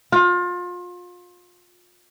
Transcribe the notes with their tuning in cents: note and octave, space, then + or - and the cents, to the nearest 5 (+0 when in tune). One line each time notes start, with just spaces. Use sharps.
F4 +30